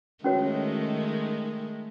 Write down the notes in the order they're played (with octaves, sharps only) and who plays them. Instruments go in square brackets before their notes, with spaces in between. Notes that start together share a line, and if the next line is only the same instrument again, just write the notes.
[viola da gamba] D#3 G#3 A3 [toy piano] C#4 F#4 C#5